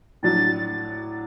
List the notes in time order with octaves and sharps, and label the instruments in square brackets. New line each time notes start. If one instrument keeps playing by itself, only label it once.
[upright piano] A2 F#3 D4 [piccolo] A6